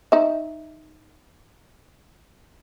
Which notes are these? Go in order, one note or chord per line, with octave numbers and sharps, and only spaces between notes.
D#4 E5